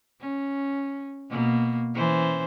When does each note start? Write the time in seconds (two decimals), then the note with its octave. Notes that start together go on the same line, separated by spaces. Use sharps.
0.20 C#4
1.30 B2 A#3
1.95 E3 C#4 C5